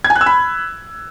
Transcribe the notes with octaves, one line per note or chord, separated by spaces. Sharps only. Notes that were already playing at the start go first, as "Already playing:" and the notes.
G#6
G#5
F#6
E6
B5